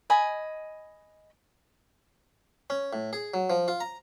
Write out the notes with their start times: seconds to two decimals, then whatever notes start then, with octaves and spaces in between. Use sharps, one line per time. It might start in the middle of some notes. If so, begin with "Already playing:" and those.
0.10 D#5 G#5 B5
2.70 C#4
2.93 A2
3.13 G#4
3.34 F#3
3.50 F3
3.68 F4
3.80 A#5